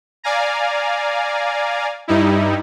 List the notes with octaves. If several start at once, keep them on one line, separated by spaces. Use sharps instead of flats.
D5 F5 G#5 A#5
G2 G3 D#4 E4